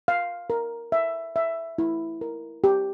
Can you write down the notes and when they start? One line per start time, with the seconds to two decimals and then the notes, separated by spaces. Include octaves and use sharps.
0.08 F5
0.50 A#4
0.92 E5
1.36 E5
1.78 E4
2.21 A#4
2.64 G4